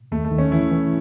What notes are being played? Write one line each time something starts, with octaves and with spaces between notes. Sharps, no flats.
D#2 A3
A3
D#3
C#4
E3 E4
E3